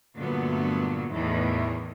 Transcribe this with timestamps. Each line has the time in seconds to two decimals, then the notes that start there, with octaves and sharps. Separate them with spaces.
0.17 G2 A#2 D3 F#3 A3 B3
1.13 E2 A2 D#3 E3